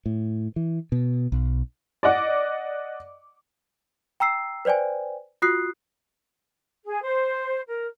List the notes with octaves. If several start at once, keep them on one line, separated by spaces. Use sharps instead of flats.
A2
E3
B2
B1
D5 D#5 F#5 D6
G5 A#5 E6 C7
B4 C5 D5 G5 G#5
F4 F#4 D#6 F#6 C7
G#4
C5
A#4